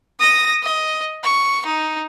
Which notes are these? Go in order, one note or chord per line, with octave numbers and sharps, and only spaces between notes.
D#6 A#6
D#5
C#6
D#4